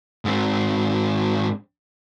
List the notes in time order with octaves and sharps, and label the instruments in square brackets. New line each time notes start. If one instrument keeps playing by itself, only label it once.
[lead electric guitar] G#2 C4